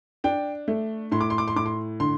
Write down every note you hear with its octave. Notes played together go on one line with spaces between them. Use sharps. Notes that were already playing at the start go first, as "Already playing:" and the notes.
D4 G5
A3
A2 C6
D6
C6
D6
C6
A2 D6
C6
D3 C6